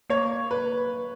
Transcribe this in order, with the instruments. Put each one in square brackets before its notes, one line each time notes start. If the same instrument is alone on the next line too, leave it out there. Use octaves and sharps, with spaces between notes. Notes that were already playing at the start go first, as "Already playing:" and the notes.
[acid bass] A#3 [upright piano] C#5
[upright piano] B4